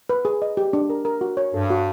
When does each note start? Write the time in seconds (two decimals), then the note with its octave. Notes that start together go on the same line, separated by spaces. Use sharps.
0.09 B4
0.25 G#4
0.42 D#5
0.57 G4
0.73 D4
0.90 A#4
1.05 A#4
1.21 F#4
1.37 C#5
1.54 G2 A4
1.70 F#4